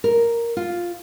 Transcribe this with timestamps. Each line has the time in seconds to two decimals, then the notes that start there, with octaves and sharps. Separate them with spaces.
0.04 A#4
0.57 F4